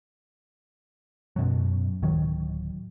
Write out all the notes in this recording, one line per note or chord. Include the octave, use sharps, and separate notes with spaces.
F#2 B2 F#3
D1 D#3 F#3